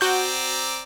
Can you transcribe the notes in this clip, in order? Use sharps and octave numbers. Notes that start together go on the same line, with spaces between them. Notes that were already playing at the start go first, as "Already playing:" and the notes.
C4 F#4 D5 A#5 G6